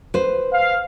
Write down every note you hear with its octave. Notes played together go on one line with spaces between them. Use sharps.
B4 C5
F5